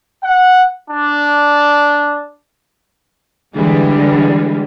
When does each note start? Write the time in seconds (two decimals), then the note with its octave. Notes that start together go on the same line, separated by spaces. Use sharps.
0.23 F#5
0.89 D4
3.56 D3 E3 G3 G#3